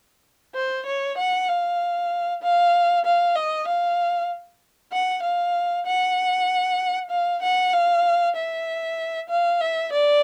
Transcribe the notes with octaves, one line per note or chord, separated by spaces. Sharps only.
C5
C#5
F#5
F5
F5
F5
D#5
F5
F#5
F5
F#5
F5
F#5
F5
E5
F5
E5
D5